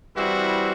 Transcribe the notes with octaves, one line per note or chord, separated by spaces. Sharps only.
E3 G3 C4 E4 F#4